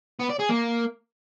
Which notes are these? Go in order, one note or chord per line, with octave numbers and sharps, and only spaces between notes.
B3
D5
G#4
A#3